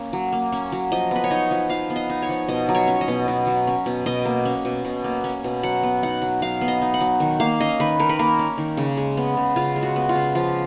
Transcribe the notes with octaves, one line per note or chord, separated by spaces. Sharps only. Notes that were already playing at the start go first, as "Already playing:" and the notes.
Already playing: A#3 C#4
F#3
A#3
C#4
F#3
F3 D#5
B3 B4
C#5
D#4 D#5
F3
F3 F5
B3
D#5
D#4
C#5
F3
B2 D#5
F#3
C#5
C#4
D#5
B2
B2
F#3
C#4
B2
B2 D#5
A#3
C#4
B2
B2
A#3
C#4
B2
F#3 F#5
B3
D#4 F#5
F#3
F#3 F5
B3
D#5
D#4
F#5
F#3
D#3
A#3 F5
C#4 D#5
D#3 B4
D#3 A#4
B4
A#3 A#4
C#4
D#3
C#3
G#3
B3
C#3
C#3 F4
G#3
F#4
B3
F4
C#3
F3 F4